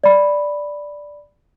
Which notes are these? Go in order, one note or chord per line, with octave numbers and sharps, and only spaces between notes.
D5 B5